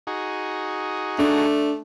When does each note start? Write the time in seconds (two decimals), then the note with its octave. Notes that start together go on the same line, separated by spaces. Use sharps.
0.07 D#4 F#4 G#4
1.19 A3 D4